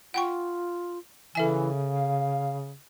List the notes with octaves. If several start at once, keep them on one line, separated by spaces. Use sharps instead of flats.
F4 F#5 G5 C#6
C#3 E3 A4 E5 G#5
F5